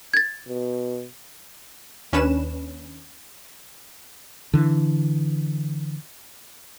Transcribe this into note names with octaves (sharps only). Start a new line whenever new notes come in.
G#6 A6
B2
D#2 C#4 D4 B4 E7
D3 E3